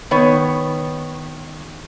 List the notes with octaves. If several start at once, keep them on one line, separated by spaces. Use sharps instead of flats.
D#3 B3 C#5